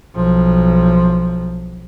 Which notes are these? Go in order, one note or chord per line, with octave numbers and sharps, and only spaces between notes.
B1 F3